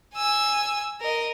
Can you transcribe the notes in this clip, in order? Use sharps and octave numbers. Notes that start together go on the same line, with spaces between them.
G#5 E6
A#4 D#5